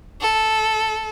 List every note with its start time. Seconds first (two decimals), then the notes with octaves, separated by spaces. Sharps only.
0.21 A4